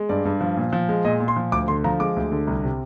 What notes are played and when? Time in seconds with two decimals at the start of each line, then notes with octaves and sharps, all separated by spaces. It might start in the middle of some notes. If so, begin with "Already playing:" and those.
Already playing: G#3
0.09 G2 D5
0.25 G2
0.41 F3
0.57 A#2
0.73 F3
0.89 G#3
1.05 A#2 D#5
1.20 A#2
1.28 C6
1.36 F3
1.52 D2 D6
1.68 D3 C6
1.84 F3 A#5
2.00 G#3 D6
2.17 D2
2.32 D3
2.47 C2
2.64 C3